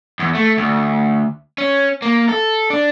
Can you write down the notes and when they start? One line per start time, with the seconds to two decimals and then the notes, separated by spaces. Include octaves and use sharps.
0.19 E2
0.35 A3
0.57 D2
1.58 C#4
2.02 A#3
2.29 A4
2.70 D4